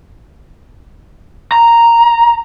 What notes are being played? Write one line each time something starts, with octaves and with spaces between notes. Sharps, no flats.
A#5